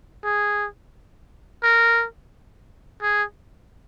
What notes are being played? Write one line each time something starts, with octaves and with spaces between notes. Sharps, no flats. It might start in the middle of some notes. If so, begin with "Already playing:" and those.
G#4
A#4
G#4